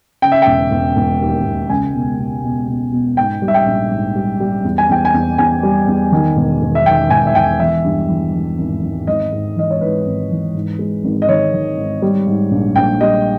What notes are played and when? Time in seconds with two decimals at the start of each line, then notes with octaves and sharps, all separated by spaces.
0.22 C#3 G5
0.32 E5
0.42 E1 G5
0.71 E1
0.96 E1
1.21 D#2
1.45 E1
1.69 C#2 G#5
1.95 B2
2.19 B2
2.44 B2
2.68 B2
2.92 B2
3.17 G#2 G5
3.42 G3
3.48 E5
3.54 G5
3.66 A#1
3.91 G#2
4.16 G3
4.40 G3
4.64 E2
4.78 G#5
4.89 E2 G5
5.05 G#5
5.14 E2
5.38 E2 G#5
5.63 G3
5.88 E2
6.12 D#3
6.36 E1
6.62 E1
6.75 E5
6.86 D#3 G5
7.10 E1 G#5
7.27 E5
7.35 E1 G5
7.59 E3 E5
7.84 G2
8.09 E3
8.33 E3
8.58 G#1
8.83 G#1
9.07 G#1 D#5
9.32 G#2
9.56 E3 D#5
9.71 C#5
9.81 G#2 B4
10.06 G#1
10.31 E3
10.55 G#2
10.79 G#3
11.04 G#1
11.22 D#5
11.29 D#3 C#5
11.53 D#3
11.77 G#2
12.02 G3
12.27 G#2
12.51 A#1
12.76 A#1 G5
13.01 G3 D#5